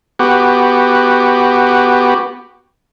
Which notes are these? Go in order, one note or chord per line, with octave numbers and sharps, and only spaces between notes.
B3 F#4 G4